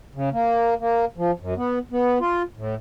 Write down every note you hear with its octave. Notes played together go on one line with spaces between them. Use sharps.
C#3
A#3
A#3
F3
F#2
B3
B3
F4
A2